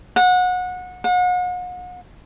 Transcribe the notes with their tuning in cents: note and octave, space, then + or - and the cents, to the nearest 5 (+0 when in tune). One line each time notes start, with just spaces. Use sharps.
F#5 -25
F#5 -40